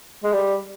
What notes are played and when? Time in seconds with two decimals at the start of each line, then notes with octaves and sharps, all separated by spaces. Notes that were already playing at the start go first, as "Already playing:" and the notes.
0.24 G#3
0.33 G3